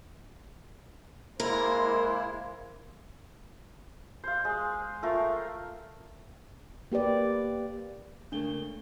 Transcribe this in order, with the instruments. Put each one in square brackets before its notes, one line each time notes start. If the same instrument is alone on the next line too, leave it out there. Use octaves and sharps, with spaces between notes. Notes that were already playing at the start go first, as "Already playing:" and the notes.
[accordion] G#3 A#3 E4 [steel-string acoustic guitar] A#4 [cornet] C5
[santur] C5 F5
G#3
A3 F4 A#4
[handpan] A#3 G4 B4 D5
[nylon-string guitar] C#3 A3 A#3 [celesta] D4 G7